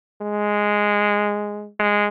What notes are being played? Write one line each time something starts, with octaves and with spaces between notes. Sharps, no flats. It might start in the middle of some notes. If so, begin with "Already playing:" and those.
G#3
G#3